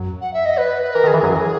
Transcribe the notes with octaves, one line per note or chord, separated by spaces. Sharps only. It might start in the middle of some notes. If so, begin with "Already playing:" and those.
Already playing: F#2 F#3
F#5
E5
D#5
B4
B4
E3 A#4
D#3
G#4
E3
F#2 F#3 G#4
E3 A#4
G#4